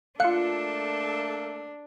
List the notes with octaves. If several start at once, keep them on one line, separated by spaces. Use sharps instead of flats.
A3 A#3 D4 F4 A4 F5 F#6 C#7